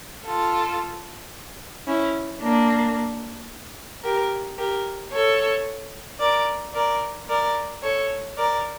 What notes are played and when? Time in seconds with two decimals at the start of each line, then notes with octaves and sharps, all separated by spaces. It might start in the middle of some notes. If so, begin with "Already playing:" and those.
0.24 F4 A4
1.86 C#4 E4
2.41 A#3 D4
4.03 G4 A#4
4.57 G4 A#4
5.12 A4 C#5
6.19 A#4 D5
6.73 A#4 D5
7.28 A#4 D5
7.82 A4 C#5
8.37 A#4 D5